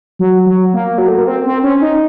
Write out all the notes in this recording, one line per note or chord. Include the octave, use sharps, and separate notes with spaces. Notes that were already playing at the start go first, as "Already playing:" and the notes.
F#3
F#3
A#3
F#3
A3
A#3
C4
C4
C#4
D#4